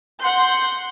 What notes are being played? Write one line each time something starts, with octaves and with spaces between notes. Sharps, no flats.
F#5 C6 G6